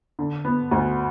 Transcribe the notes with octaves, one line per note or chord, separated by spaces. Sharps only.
D3
B3
D2